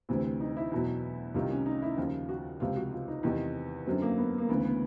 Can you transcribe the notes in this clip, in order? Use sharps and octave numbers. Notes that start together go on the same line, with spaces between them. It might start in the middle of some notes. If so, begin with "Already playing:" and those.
D2 C3 E3 C4
D#4
E4
E2 B2 F#3
C2 C3 D#3 F4
C#4
D#4
E4
D#2 C#3 F3 F4
F#4
C#2 C3 F3 F4
F#4
F4
D#4
E2 C3 D#3
F#2 D3 F#3 C4
A#3
B3
A#3
D2 C#3 E3 B3
B3